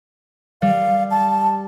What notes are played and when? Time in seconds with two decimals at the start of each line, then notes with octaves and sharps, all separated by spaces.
0.62 G3 F5
1.11 A5